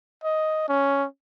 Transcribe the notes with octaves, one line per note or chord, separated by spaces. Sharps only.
D#5
C#4